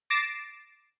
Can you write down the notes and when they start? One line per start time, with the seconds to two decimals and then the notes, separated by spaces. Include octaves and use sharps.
0.10 D6 A6 A#6 C7 D7 E7